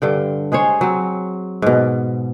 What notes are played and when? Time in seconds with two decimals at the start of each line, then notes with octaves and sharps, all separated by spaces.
0.02 G2 D3 G5
0.52 G#3 G#4 C5 C#5
0.81 F#3 C4
1.62 G#2 B2